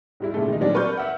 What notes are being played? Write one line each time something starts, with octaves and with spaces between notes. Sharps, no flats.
G#2 G3 E4
A#2 C#3 G#3 A3
D#3 D#4
A#2 F#3 G3 C4 D4
A#4 B4 D5 C#6 F6 G6
E5 F#5